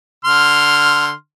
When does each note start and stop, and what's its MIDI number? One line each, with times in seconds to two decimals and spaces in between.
0.25 1.13 50
0.25 1.13 84
0.25 1.13 89